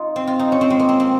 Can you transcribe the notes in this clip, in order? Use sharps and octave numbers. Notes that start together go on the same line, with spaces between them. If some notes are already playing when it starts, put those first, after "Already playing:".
Already playing: D#4 F4
C4
F4
D#4
C#4
C4
G#3
A#3
C4
C4